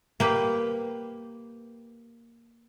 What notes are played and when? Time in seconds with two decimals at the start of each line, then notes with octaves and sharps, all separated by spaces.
0.20 A#3 G4 B4